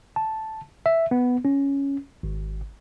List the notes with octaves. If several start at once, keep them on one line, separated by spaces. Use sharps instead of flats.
A5
E5
B3
C#4
G#1